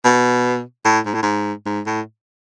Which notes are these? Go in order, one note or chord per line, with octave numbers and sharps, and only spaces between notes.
B2
A2
G#2
A2
G#2
G#2
A2